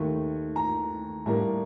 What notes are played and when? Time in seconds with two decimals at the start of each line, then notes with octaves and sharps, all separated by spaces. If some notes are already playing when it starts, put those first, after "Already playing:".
Already playing: D#2 D#3 A3
0.56 A#5
1.26 A2 G3 A#3 D4 A#5